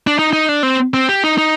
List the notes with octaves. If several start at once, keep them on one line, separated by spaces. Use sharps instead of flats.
D4
D#4
D#4
D4
C4
C4
G4
D#4
D#4